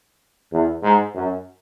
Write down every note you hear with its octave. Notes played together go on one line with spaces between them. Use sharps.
E2
G#2
F#2